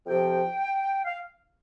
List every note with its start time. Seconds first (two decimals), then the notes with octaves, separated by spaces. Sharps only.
0.06 F2 C3 F3 G5
1.04 F5